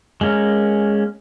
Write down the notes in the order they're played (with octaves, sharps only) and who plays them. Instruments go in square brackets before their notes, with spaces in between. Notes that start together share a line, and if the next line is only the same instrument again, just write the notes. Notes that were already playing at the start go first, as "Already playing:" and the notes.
[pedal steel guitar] G#3 A#3 C#4 A#4